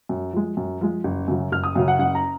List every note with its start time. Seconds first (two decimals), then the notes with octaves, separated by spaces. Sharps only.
0.09 F#2
0.33 F3 G#3
0.57 F#2
0.81 F3 G#3
1.04 F#1
1.28 F#2 C#3 F#3
1.52 F#1 F6
1.64 D#6
1.75 F#2 C#3 F#3 F5
1.88 F#5
1.99 F#1 F#5
2.15 A#5